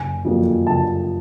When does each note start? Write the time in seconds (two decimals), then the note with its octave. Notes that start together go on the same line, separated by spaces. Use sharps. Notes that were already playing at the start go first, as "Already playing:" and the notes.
Already playing: F#1 G#5
0.25 F2 D3 F#3 A#3
0.67 F#1 A5